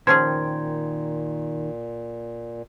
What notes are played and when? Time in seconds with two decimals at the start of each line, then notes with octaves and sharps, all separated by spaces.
0.07 A#2 D#3 F3 C#4 G#4 G5 C6 G#6